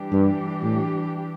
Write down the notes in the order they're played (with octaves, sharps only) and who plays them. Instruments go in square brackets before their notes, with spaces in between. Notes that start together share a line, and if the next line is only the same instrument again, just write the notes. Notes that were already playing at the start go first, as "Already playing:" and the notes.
Already playing: [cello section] E3 G3 D4 G4
[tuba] G2
A2